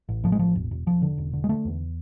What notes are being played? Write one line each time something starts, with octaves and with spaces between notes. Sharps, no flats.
A1
A2 F3
G#3
A1 F3
E1
E1
E1 F3
D3
E1
D3
G#3
D3 A3
E2